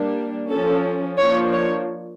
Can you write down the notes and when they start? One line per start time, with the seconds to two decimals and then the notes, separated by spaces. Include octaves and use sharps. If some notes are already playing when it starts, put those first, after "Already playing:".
Already playing: G3 A#3 D4
0.49 F3 C#4 A4
1.18 F3 A#3 D4 C#5
1.52 C#5